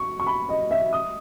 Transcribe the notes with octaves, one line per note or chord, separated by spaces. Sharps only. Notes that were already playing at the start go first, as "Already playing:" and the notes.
Already playing: C#6
C#6
B5
D#5
E5
D#6